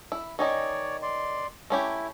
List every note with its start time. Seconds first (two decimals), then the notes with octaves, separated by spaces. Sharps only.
0.12 E4
0.39 D#3 C#4 D#4 C#5 D5
1.02 D5 C6
1.70 A3 C#4 E4 G4